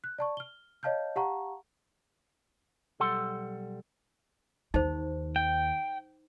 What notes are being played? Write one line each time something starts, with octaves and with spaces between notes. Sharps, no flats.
F#6
D5 A5 C#6
F6 G7
C#5 D#5 F5 A5 F6 G6
G4 F5 F#5 A5 A#5 C#6
B1 G3 A4 F#5 C6
D#2 D#4 C5
G5